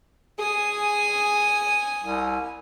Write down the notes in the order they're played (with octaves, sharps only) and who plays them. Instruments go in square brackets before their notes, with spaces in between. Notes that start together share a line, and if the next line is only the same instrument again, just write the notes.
[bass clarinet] G#4 [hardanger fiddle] G#5 [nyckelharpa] D#6
[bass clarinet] C2